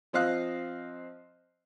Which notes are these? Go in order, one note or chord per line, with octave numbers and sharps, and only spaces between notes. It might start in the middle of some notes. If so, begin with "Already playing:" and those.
F3 C4 D#5 F5 F#6